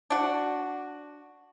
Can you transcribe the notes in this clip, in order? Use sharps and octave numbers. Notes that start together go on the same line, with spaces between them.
D4 F#4